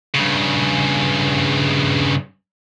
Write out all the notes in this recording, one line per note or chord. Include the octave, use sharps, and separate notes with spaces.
G2 C#3